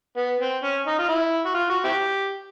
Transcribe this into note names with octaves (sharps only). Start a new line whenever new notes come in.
B3
C4
C#4
D#4
F4
E4
F#4
F4
F#4
C4 E4 G4